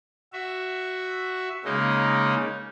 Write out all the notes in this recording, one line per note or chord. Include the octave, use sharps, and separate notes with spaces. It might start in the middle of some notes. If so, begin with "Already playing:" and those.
F#4 E5
C#3 G#3 A#3 D#4